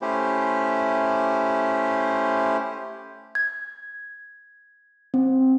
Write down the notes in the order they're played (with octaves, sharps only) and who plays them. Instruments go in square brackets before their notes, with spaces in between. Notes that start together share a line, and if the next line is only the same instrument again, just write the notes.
[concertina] A3 C#4 E4 G4 C5
[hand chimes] G#6
C4